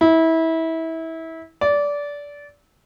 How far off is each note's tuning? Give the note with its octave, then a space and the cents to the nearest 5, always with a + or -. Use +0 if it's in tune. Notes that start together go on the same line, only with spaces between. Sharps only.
E4 -25
D5 -20